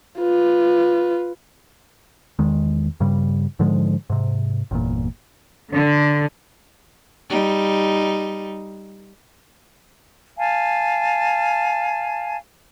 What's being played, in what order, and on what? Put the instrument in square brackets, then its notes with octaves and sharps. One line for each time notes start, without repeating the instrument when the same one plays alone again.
[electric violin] F4 B4
[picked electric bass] E2 D#3 G#3
G2 C#3 G3
G#2 D3 F3 G#3
G#2 C3
G1 E2 A#2
[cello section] D3
[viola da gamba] G3 D#4
[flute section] F5 G#5 A5